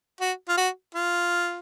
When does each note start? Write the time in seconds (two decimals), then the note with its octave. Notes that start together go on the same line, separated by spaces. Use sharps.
0.21 F#4
0.49 F4
0.57 F#4
0.95 F4